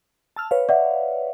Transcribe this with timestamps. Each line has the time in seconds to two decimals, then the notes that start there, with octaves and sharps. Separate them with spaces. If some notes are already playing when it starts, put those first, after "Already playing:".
0.36 A5 E6 F6
0.51 B4 C#5 F5
0.69 D5 E5 F#5